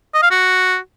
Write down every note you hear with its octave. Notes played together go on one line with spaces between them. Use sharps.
D#5
F5
F#4